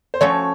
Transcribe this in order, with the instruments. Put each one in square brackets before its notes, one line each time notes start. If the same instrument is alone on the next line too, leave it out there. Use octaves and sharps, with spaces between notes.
[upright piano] C5
[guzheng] F3 A3 C#4 F#4 A4 [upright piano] C#5